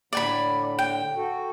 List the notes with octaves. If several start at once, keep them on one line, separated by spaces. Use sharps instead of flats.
A2 D3 D5 G#5 B5
G5
F#4 A4